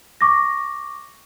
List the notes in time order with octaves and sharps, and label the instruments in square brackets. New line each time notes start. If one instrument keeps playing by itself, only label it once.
[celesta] C#6 D6 A#6